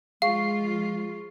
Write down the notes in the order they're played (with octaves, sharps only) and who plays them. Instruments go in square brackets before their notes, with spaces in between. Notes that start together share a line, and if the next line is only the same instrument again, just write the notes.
[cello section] F3 F4 [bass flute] G#3 [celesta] G#4 C#6 C7 [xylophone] F5